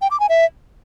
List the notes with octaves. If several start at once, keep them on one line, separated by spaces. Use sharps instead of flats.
G5
D6
G#5
E5